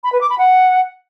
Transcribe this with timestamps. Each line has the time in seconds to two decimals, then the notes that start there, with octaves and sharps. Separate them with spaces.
0.04 B5
0.12 B4
0.21 D6
0.30 B5
0.38 F#5